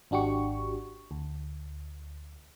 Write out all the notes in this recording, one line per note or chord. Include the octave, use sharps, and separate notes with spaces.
G#1 D4 F#4 G4 C#6
D2